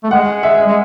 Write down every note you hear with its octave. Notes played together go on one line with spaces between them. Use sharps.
A3
G#3 F#5
E5
G#3